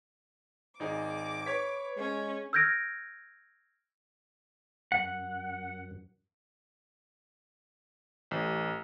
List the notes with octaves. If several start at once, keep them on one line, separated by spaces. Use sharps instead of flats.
G#1 D#4 G#4 D6
B4 C#5 G#6 B6
G#3 C#4
E6 F6 G6 G#6 A#6 D7
F#2 F#5
A1